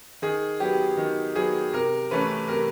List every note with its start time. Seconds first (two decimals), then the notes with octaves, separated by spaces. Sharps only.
0.22 D#3 G#4
0.60 F#3 B3 G4
0.97 D#3
1.36 F#3 B3 G#4
1.73 C3 A#4
2.11 E3 A3 C#4 B4
2.48 C3 A#4